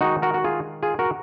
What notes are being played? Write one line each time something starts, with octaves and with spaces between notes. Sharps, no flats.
D#3 G#3 D#4 F#4
F#4 A#4
F#4
F4 G#4
F4 G#4
F#4 A#4